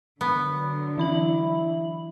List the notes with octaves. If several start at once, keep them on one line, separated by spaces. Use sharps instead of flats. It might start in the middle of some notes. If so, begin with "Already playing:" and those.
D3 F#3 B3
E3 E4 B5 F#7